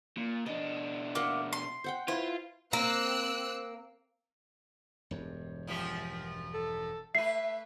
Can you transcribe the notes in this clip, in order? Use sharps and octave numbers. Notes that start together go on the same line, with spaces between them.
A#2
B2 D4 D#5
A#3 E5 F#5
C6
C5 F#5 G5
E4 F4 B4 C5
A#3 C4 E6 F#6
E1 G2
F#2 F3 G4
A4
A3 B4 E5 C7